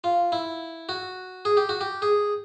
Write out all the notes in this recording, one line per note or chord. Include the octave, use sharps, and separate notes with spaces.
F4
E4
F#4
G#4
G4
F#4
G4
G#4